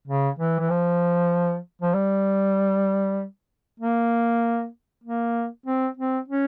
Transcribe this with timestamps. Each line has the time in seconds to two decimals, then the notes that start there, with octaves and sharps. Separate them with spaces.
0.08 C#3
0.39 E3
0.60 E3
0.70 F3
1.82 F3
1.94 G3
3.80 A#3
5.04 A#3
5.66 C4
5.97 C4
6.28 C#4